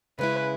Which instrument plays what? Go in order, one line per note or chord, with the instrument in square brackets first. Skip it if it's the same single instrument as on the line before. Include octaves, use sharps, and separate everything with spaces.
[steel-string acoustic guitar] C#3 G#3 C#4 E4 [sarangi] B4